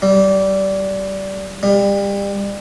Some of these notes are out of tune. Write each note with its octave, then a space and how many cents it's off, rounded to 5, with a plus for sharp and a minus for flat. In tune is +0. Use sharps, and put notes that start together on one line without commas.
G3 -20
G3 +30